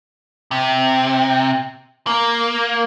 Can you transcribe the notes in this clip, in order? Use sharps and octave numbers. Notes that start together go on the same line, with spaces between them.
C3
A#3